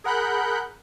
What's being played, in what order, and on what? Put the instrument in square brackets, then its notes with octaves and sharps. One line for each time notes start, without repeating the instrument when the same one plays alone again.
[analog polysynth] G#4 A#4 F#5 B5 F#6 G6